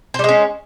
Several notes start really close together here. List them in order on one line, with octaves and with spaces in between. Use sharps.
C5 G3 G#3 C#4